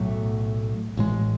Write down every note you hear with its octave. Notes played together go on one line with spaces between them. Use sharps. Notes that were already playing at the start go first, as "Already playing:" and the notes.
Already playing: B1 A2 F#3 A3
A1 A2 G#3